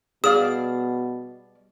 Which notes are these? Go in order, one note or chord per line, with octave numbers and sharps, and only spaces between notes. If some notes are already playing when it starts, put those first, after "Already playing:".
B2 G3 G#4 D5 F5 D#6